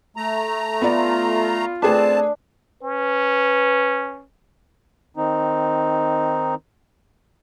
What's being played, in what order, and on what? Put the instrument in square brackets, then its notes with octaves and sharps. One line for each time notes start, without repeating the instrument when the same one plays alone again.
[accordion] A3 A#5
[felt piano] B3 D5 [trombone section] F4
[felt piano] A3 G#4 B4 [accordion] C4 A5 [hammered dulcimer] D4
[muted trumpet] C#4 [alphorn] B4
[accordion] D#3 C4 D#4